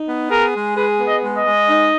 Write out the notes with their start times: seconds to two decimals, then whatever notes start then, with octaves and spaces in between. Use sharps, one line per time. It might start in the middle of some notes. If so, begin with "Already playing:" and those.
Already playing: D#4
0.08 B3
0.31 G#4 A#4
0.54 G#3
0.77 G#4 B4
1.00 B3
1.08 D#5
1.23 G#3
1.38 D#5
1.46 G#3
1.69 D#4